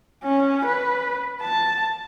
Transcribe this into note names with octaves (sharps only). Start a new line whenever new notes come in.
C#4
B4
A5